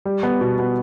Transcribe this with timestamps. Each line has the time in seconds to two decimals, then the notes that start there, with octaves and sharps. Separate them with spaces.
0.05 G3
0.23 B3
0.41 B2
0.59 B3